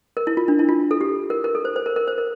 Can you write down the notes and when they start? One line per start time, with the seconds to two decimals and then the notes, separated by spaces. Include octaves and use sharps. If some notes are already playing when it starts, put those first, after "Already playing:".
0.17 A#4
0.27 E4
0.37 F4
0.48 D4
0.59 E4
0.69 F4
0.91 A4
1.01 G4
1.30 A#4
1.44 A#4
1.55 A4
1.65 C5
1.76 C5
1.86 A#4
1.96 A#4
2.07 C5
2.18 A#4